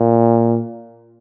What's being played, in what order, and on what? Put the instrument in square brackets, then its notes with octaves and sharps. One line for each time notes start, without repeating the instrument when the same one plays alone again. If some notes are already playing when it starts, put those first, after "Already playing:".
Already playing: [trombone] A#2